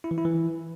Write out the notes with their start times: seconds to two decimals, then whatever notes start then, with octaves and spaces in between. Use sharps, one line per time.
0.04 E4
0.11 E3
0.18 E4
0.25 E3